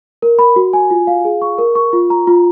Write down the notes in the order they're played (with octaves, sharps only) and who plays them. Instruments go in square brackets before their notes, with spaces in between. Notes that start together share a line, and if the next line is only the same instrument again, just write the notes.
[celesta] A#4
B5
F#4
G#5
F4
F5
G#4
C#6
A#4
C#6
F4
A#5
F4